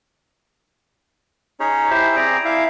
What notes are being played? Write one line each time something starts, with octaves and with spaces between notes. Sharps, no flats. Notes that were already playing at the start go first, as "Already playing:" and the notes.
C#4 D#4 G#4 C#5
E4 G4 C5 E5
C4 G#4 D5 A#5
E4 E5 F5